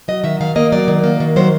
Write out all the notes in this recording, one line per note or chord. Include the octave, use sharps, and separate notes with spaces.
F#3 D#5
D#3 E5
D#3 F5
A#3 D#5
F#3 D5
D#3
A#3
D#3
F#3 C5